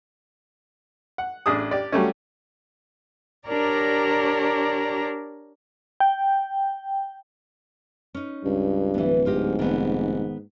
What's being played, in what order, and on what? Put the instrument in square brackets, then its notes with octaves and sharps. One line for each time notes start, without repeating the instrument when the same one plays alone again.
[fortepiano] F#5
A1 D4 G#4 D#6
G4 D5
F#3 G3 A3 C#4
[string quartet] D4 G4 A#4 C#5 D5 A#5
[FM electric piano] G5
[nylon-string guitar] C#4 D#4
[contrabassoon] C#2 [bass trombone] G2
[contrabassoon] D1 [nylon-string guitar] E3 B3
[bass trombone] G#2 [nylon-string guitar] F4 G4 D#5
[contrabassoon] F1 [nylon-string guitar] D#3 B3